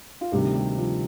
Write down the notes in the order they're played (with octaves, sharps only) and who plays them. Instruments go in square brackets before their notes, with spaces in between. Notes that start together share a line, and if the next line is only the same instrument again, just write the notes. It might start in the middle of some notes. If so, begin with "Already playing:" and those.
[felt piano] F4
D2 C3 D#3 G3 G4
G3 G4
G4
F3 F4